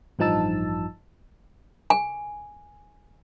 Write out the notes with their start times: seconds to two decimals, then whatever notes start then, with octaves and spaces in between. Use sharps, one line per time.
0.19 A1 G2 F3 D#4 A5 E6
1.90 G#5